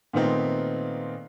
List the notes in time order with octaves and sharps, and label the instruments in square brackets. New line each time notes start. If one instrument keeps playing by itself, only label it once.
[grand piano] A#2 D#3 A3 B3 C4 D#4